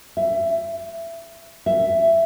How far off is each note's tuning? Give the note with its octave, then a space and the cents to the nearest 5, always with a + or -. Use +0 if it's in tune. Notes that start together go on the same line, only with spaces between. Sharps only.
E5 +20
E5 +10